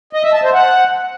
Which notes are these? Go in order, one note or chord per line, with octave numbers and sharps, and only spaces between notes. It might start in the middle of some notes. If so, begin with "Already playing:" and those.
D#5
E5
A5
C5
F#5